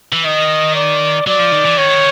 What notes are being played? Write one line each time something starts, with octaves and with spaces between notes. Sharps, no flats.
E3
D#3 D#5
D5
F#3 D5
F3
D#3
E3
D#3 C#5